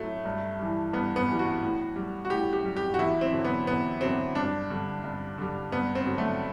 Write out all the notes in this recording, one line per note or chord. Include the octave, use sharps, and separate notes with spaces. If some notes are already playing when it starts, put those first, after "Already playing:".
Already playing: A2 F#3 A3
G2
E3 G3
G2 B3
B3
E3 G3
F#4
A2
G3
F#4
A2 G4
G4
G3
G4
F#4
E2 E4
C4
D3 F#3
B3
E2 B3
D3 F#3 C4
G2 D4
D3 G3
G2
D3 G3
G2 B3
C4
D3 F#3
A3